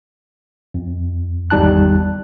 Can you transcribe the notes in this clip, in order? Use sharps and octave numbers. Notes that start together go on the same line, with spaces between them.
F2
G#1 E2 G3 D#4 A5 F#6